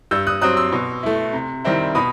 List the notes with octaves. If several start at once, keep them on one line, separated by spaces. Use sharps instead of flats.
G2 E6 G6
D#6 F#6
F#3 C4 D#6 F#6
C6 E6
B2
A3 E4
C3
D#3 G3 C4 E4
B2 B5 D#6